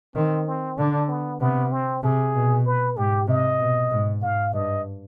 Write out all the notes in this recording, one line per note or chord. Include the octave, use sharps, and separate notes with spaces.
D#3 C4
C4
D3 D4
B3
C3 B3
C4
C3 G#4
B2
B4
G#2 G4
C3 D#5
B2
G#2
G#2 F5
G2 D#5